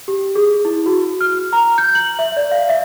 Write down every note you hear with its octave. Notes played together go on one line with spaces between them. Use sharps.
G4
G#4
E4
F#4
F6
A#5
G6
F#7
E5
D5
F5
E5